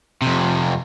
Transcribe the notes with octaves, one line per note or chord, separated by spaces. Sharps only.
F2 C3